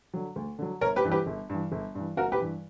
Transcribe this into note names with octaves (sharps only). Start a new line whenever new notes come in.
D3 F#3
D2
D3 F#3
G1 A#4 C#5
G4 B4
G2 E3
G4 B4
G1
G2 E3
G1
G2 E3
G1 F#4 A#4
G4 B4
G2 E3